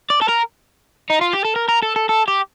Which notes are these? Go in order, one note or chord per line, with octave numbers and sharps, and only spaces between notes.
D5
A4
A#4
D#4
F4
G4
A4
A#4
A#4
A4
A4
A4
G4